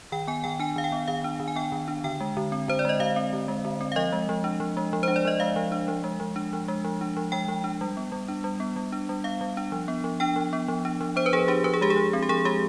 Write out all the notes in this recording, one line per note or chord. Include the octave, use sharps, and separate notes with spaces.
D#3 G5
B3 G#5
D#3 G5
D4 G#5
D#3 F5
G5
B3
D#3 F5
D4
D#3
G#5
B3 G5
D#3
D4
D3 G5
G#3
D3
C4
D3 C5
D5
G#3 D#5
D3 F5
C4
D3
G#3
D3
C4
F5
F3 D#5
G#3
F3
D4
F3
G#3
F3
D4 C5
D5
F3 D#5
G#3 F5
F3
D4
F3
G#3
F3
D4
F3
G#3
F3
D4
F3
G#3 G5
F3
D4
G3
B3
G3
D4
G3
B3
G3
D4
G3
B3 F5
G3
D4
F3
B3
F3
D4 G5
F3
B3
F3
D4
F3
B3 C5
B4
F3 G#4
D4 G4
F3 B4
G#4
G#3 G4
G#4
F3
C4
G4
F3 G#4
G#3 G4